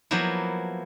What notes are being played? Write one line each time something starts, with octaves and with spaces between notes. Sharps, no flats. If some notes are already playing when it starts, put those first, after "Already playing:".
F3 F#3 A#3 B3 E4